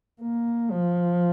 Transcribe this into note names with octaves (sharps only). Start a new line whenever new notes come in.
A#3
F3